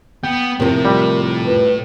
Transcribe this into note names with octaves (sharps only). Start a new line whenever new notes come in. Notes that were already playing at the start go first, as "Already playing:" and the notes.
B3 G5
F2 A2 C3 A#4
G3
B4